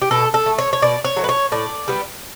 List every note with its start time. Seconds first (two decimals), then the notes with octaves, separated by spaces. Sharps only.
0.02 G4
0.11 B2 A4
0.34 A4
0.46 A3
0.59 C#5
0.73 C#5
0.82 B2 D5
1.05 C#5
1.16 F#3 A3
1.24 B4
1.29 C#5
1.52 A2 D5
1.88 G3 B3